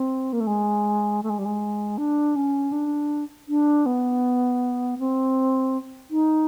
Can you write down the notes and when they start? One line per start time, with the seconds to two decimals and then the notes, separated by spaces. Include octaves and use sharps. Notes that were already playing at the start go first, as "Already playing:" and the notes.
Already playing: C4
0.33 A#3
0.40 A3
0.47 G#3
1.23 A3
1.30 G#3
1.39 G3
1.45 G#3
1.98 D4
2.36 C#4
2.72 D4
3.48 D4
3.86 B3
4.99 C4
6.10 D#4